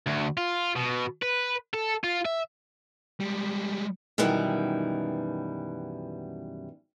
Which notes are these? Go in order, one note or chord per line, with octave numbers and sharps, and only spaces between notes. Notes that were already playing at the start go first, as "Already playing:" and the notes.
D2
F4
B2
B4
A4
F4
E5
G3 G#3
F#2 B2 D#3 E3 G3